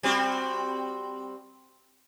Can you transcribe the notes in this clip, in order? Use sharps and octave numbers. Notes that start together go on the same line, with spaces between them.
G3 C4 F#4